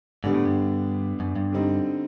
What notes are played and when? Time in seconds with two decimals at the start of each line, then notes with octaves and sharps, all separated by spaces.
0.24 G#2 D3 G3 B3 D4
0.34 A2
0.45 G2
1.20 F#2
1.36 G2
1.52 D3 G3 C4 D#4